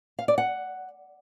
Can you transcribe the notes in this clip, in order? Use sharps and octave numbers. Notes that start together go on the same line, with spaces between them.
F5
D5
F#5